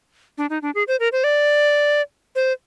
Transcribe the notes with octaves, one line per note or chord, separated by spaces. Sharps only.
D4
D#4
D4
G#4
C5
A#4
C5
D5
C5